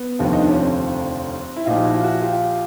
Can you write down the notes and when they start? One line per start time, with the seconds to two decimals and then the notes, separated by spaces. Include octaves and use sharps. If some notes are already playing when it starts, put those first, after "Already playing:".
Already playing: B3
0.19 F1 D#2 D3 F3
0.33 D#4
0.41 D4
0.49 C#4
0.56 C4
1.56 E4
1.66 A#1 A#2 F3 D#4 F4
1.77 G4
1.85 E4 F#4
1.95 F4
2.03 E4 F#4
2.21 F4 G4